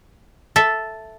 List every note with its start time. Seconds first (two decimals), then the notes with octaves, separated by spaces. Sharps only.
0.56 A4 E5 A6